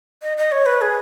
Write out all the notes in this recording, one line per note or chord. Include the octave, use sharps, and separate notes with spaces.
D#5
D#5
C#5
B4
G#4